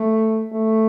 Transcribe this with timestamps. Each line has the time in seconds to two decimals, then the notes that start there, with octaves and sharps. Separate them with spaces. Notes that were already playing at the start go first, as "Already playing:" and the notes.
Already playing: A3
0.52 A3